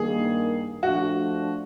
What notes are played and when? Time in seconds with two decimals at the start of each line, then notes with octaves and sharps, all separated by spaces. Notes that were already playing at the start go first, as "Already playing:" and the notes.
Already playing: G2 D#3 G3 A#3 G#4
0.83 F3 A3 D4 F#4